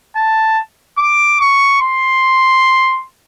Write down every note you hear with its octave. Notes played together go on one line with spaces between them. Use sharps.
A5
D6
C#6
C6